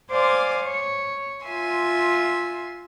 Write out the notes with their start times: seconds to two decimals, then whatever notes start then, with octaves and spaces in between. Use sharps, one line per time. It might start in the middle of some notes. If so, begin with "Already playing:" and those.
0.11 C5 D5 F5 G#5 D6
0.63 C#5
1.46 F4 E5 G#5 C6